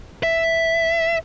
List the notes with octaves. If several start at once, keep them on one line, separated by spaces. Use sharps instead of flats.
E5